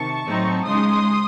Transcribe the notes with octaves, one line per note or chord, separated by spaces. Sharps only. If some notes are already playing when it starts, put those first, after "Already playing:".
Already playing: C3 D#3 A5 C#6
A2 F#3 C4 D#4
C#3 G#3 D#4 C6 D#6